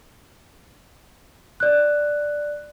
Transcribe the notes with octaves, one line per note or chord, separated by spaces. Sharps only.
D5 F#6